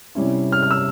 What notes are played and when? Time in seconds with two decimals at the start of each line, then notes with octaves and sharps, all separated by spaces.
0.15 C3 G3 C#4 E4
0.52 F6
0.63 F6
0.71 E6